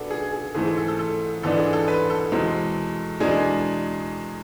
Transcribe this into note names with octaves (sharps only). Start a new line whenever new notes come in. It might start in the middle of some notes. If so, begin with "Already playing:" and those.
Already playing: B2 B3 D4 G#4 A4
G#4
G#4
G#2 E3 A3 C4 G#4
G#4
A4
A4
A4
G#2 E3 B3 D4 A4
G#4
A4
B4
A4
E2 B2 G#3 C4
E2 B2 G#3 D4 G#4